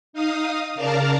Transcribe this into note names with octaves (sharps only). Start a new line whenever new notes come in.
D#4 F5 D#6
C#3 A#4 D5 F5 A5 A#5